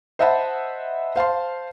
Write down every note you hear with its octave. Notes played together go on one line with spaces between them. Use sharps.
C5 D#5 E5 F#5 A5 B5
C5 F5 A5 C6